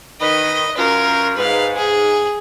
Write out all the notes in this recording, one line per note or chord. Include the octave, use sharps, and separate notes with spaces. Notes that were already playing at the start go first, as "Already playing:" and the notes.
D#3 B4 D#5
F#2 F4 A#4
G#2 B4 F5
G#4